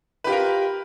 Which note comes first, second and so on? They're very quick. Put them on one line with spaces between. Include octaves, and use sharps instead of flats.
B4 G4 F4 A#4